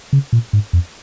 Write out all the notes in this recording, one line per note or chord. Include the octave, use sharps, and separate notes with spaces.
C#3
A#2
G#2
F2